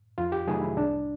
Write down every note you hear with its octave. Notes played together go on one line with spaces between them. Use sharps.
F2 F4
G4
C3 D#3 F#3 A3 G#4
E4
C2 D4